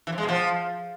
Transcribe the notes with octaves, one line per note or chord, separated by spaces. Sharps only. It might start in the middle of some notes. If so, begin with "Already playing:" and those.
E3
C3
G#3
B2
F3